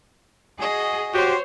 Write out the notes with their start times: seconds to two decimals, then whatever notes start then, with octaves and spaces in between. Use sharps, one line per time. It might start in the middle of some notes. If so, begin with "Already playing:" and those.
0.60 F#4 G#4 D#5
1.14 F#4 G4 C5 C#5